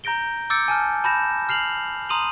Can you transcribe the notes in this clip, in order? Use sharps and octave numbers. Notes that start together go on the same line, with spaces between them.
A#5 G6 A#6 D7 G7
D6 E6 G6 A6 C#7 D7
G#5 A5 F6
A5 B5 G6 A#6 E7
F6 C7 F7 F#7
A#5 C6 D#6 D#7 F7 F#7